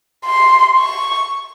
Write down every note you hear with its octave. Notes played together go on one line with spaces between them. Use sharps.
C6
C#6